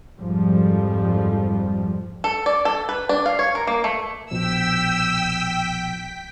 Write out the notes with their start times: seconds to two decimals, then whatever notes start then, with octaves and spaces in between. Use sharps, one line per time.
0.19 F2 G#2 F3 G3
2.24 A4
2.46 D5
2.65 A4
2.89 B4
3.09 D4
3.26 F5
3.39 C#5
3.55 A#4
3.67 A#3
3.84 A3
4.31 A#1 B2 F3 G5 E6 B6